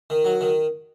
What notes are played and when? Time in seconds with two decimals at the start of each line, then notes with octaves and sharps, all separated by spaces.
0.10 D#3
0.25 F#3
0.41 D#3